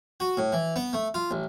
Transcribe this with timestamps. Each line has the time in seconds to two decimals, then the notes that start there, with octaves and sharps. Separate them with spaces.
0.20 F#4
0.37 A2
0.53 E3
0.76 B3
0.93 A3
1.14 F4
1.31 A1